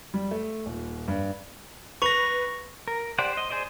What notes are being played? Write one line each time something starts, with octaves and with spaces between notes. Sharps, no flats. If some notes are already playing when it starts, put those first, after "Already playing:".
G3
A3
D#1
G2
B4 C#6 A#6 F7
A#4
G4 C5 D5 F#5
C5 D#5
G#4 C5 D5 D#5